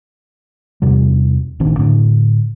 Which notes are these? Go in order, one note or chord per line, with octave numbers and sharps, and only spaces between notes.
E2 C3 G3
A1 D#3 C4 D4
A2 D3